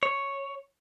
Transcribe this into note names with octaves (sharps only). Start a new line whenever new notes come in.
C#5